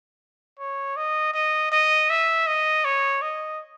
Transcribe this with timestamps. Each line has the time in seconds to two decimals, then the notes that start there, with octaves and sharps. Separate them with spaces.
0.59 C#5
0.96 D#5
1.34 D#5
1.72 D#5
2.10 E5
2.47 D#5
2.85 C#5
3.22 D#5